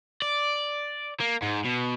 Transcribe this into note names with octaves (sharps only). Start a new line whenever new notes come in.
D5
A#3
G#2
B2